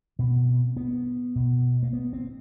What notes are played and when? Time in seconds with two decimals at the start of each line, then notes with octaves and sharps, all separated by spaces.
0.19 B2 C4
0.76 B3
1.36 B2
1.83 A#3
1.93 B3
2.13 C4